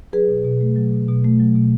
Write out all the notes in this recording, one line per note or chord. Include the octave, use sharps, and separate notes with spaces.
F#3 G#4 B4
B2
B2
A3
F#3
B2
B2
A3
F#3
B2